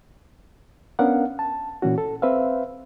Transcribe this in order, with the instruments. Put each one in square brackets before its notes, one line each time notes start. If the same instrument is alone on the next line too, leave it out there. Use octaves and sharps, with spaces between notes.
[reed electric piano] B3 C#4 D4 A#4 F5 F#5
A5
A#2 E3 C#4 F#4
A4
C4 B4 C5 E5 F5